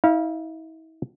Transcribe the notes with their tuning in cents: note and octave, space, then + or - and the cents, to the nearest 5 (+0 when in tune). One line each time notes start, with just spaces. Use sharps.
E4 -45 F5 -15